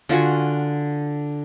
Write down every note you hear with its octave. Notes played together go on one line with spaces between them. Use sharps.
D3 F4 F#4 G#5